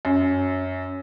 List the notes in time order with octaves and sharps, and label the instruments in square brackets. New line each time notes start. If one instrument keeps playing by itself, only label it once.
[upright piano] F#2